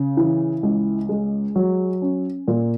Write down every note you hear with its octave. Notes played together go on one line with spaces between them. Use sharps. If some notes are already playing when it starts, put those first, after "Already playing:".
Already playing: C#3
E3
C#2
G#3
F#3
C#4
A#2